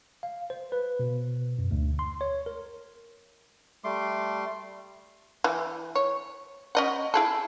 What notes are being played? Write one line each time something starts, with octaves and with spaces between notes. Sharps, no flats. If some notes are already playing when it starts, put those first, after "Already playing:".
F5
C5
B4
B2
F#2
D2
C6
C#5
A#4
G3 A3 C6 D6
E3
C#5
C#4 D#5 F#5
E4 G#4 A4